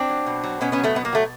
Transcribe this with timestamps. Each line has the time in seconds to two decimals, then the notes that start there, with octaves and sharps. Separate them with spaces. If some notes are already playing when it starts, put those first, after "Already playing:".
Already playing: C4 D4
0.09 F#3
0.26 B2
0.44 F#3
0.61 B2 B3 C#4
0.72 B3 C#4
0.78 F#3
0.84 A3 B3
0.95 B2 B3
1.05 A#3
1.13 F#3 A3